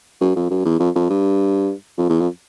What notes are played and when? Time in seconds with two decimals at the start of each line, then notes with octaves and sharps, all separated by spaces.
0.21 F#2
0.36 F2
0.50 F#2
0.65 E2
0.80 F2
0.95 F2
1.10 G2
1.98 F2
2.09 E2
2.20 F2